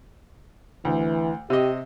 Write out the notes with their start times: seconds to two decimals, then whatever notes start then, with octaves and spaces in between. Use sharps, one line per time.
0.85 D2 E3
1.50 C3 G4 D#5